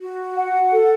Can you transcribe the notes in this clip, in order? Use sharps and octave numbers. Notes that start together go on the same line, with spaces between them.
F#4
F#5
A4